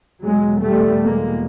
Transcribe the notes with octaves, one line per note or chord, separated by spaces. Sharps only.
E2 B2 F#3 G#3
G3 A3
G#3 A#3